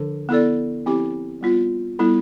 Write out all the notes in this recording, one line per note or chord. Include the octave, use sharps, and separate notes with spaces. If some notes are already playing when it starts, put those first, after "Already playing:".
Already playing: D3 F3 D4 A4
B3 E4 A4 D5
F3 C4 E4 G4
G3 B3 F4
G3 B3 E4 A4